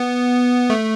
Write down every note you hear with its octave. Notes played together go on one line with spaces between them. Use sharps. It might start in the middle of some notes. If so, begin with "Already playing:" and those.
Already playing: B3
A3